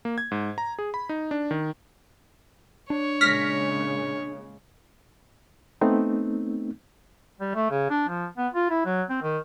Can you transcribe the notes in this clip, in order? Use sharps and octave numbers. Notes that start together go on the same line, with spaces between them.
A#3
G#6
G#2
A#5
G#4
B5
D#4
D4
D#3
D4 C#5
A#2 C#3 G#3 F6 A#6 B6
A3 B3 C4 D#4
G3
A3
C#3
D4
F3
B3
F4
E4
F#3
C4
D#3